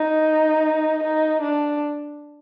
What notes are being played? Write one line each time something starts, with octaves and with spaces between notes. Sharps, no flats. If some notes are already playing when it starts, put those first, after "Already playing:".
Already playing: D#4
D#4
D4